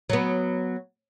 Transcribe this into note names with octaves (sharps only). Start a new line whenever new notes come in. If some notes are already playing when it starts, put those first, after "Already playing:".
F#3 B3